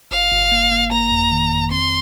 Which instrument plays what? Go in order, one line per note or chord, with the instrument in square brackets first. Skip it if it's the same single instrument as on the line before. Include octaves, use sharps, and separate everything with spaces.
[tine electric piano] G1 [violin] F5
[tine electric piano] G1
A#3
A#3
[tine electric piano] A#3 [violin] A#5
[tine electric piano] F2
D#3
F2
[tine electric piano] C4 [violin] C6